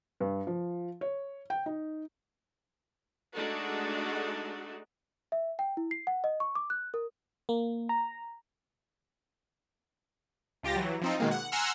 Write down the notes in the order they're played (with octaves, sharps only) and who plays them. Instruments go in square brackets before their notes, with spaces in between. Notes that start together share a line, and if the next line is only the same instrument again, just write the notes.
[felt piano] G2
F3
C#5
G5
D#4
[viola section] G#3 A3 D4 D#4 F#4 A4
[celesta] E5
G5
E4
C7
F#5
D#5
C#6
D6
F#6
A#4
[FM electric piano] A#3
A#5
[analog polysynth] C#2 F4 G4 A6 A#6
E3 F#3
F3 C4 D#4
B2 D#3 G#3 A#3
F#5
F#5 G#5 A#5 C6 E6 F6